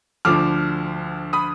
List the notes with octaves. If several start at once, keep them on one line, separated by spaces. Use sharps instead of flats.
D2 D3 F3 D6 F6
B5 D#6